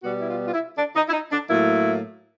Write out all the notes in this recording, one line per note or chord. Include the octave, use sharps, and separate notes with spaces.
B2 G3 B3 F#4
E4
F4
F4
E4
D4
D#4
E4
D#4
D4
A2 F#3 A#3 E4